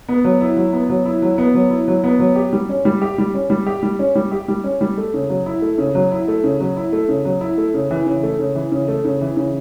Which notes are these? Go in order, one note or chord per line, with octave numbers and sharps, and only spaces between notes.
B3
F#3
E4
F#3
B3
F#3
E4
F#3
B3
F#3
E4
F#3
B3
F#3
G4
G3
C#4
G3
G4
G3
C#4
G3
G4
G3
C#4
G3
G4
G3
C#4
G3
A3
C#3
F#3
E4
A3
C#3
F#3
E4
A3
C#3
F#3
E4
A3
C#3
F#3
E4
A3
C#3
E3
C#3
A3
C#3
E3
C#3
A3
C#3
E3
C#3